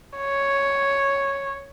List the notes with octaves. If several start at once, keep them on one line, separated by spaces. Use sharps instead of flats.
C#5